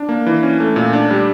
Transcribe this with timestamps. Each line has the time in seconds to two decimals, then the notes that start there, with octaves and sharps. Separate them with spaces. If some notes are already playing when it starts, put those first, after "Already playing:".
Already playing: D4
0.09 A#3
0.26 E3
0.43 C#4
0.60 A3
0.76 A#2
0.93 D4
1.10 G3